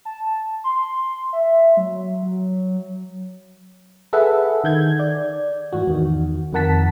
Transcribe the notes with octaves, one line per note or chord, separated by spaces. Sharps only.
A5
C6
E5
F#3
F#3
G#4 A4 B4 E5 F#5
D#3 G6 G#6
D5
G#2 E3 F#4
E2 D#3
F2 D#3 A#4 F#5 A5 B6